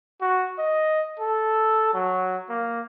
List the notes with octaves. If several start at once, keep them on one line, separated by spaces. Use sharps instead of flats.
F#4
D#5
A4
F#3
A#3